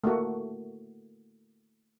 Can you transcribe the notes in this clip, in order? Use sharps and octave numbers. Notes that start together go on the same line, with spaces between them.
A3 A#3 F#4